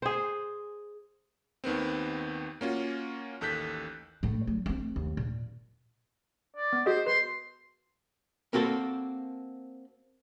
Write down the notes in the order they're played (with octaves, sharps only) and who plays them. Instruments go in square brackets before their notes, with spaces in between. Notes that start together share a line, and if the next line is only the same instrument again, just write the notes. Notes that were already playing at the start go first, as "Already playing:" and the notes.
[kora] G#4 C5
[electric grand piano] D#2 D#3 B3 C4
A#3 C#4 F4 F#4
A1 D#2 A4 F#6 G6 B6
[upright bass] A2 A3
F#3
A3 C4
D#2
A#2
[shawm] D5
[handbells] B3
[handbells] F#4 G#4 D#5 [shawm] C5
[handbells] B4 [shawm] C6
[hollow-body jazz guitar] A#3 C4 F#4 A4